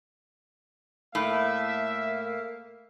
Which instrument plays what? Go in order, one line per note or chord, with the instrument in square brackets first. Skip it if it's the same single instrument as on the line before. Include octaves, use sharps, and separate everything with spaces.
[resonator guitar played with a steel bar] A2 [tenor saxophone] A#3 [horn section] E5